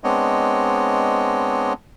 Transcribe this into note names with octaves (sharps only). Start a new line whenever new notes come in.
G#3 B3 C4 D4 C#5 D#5